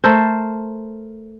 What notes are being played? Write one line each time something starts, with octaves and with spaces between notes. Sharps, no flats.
A3 A4 A#4 C5